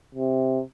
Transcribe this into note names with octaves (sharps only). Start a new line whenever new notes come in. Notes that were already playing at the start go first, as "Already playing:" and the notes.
C3